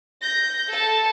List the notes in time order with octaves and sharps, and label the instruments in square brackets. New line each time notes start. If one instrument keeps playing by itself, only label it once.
[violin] G6 A#6
A4 A5